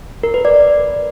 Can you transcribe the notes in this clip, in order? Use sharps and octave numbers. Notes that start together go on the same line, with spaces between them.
A#4
B4
D5